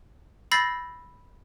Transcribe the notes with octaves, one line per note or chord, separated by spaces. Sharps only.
B5 E6 G6 A6 A#6 C7